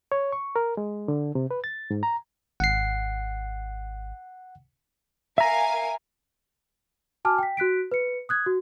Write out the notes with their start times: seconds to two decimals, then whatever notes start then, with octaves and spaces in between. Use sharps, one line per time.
0.12 C#5
0.32 C#6
0.56 A#4
0.77 G#3
1.08 D3
1.35 C3
1.51 B4
1.64 A6
1.91 G#2
2.03 A#5
2.60 G#1 F#5 C7
5.38 A#4 E5 F5 G#5 A#5
7.25 F#4 G#5 A5 D6 F6
7.38 G5 B6
7.57 F#4 F#6 B6 D7
7.92 B4 C#7
8.29 D#6 F#6 G#6
8.46 F#4